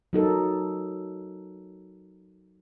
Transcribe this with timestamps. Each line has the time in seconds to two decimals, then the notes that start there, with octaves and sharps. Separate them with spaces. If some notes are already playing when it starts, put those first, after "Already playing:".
0.13 F#3 D#4 A4 A#4